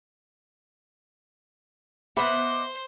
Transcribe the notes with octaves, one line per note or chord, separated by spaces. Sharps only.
B3 C5 D#5 E5 F#5 B5 D6